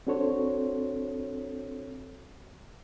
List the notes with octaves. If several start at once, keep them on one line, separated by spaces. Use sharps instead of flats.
C4 D4 F#4 A4 C5 C#5